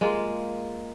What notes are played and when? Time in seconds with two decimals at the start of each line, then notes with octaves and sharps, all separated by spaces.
0.01 G#3 A#3 F4